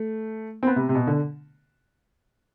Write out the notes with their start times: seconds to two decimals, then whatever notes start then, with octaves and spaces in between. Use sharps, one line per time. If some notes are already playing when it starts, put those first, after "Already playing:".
Already playing: A3
0.63 C4
0.67 B3
0.76 C3
0.89 C3
0.95 B2
1.07 D3